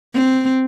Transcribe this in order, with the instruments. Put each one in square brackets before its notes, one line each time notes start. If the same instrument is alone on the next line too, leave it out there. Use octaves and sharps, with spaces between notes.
[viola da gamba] C4